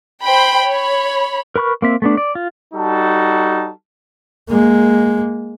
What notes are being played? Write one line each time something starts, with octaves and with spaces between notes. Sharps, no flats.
C5 G5 B5
C#5 B5
A#4 B4 B5 C#6 F6
A#3 C4 E5
A3 B3 D4
D5
F4
G3 D#4 F#4 A4 A5
G#3 A#3